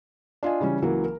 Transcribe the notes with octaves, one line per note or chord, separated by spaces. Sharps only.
D4 F4 D#5 G#5
C#3 E3 G3 C#4
C#2 E3 F#3 A#3
A#4